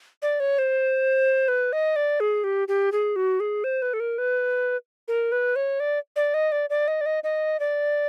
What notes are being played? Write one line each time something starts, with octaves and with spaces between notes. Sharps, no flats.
D5
C#5
C5
B4
D#5
D5
G#4
G4
G4
G#4
F#4
G#4
C5
B4
A4
A#4
B4
A#4
B4
C#5
D5
D5
D#5
D5
D5
D#5
D5
D#5
D#5
D5